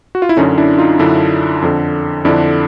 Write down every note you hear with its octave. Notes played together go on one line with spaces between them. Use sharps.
F#4
F4
E4
F#2 D3 C#4 D#4
D4 E4
D#4 F4
F#2 D3 D4 E4
F2 D3
F2 D3 D4 E4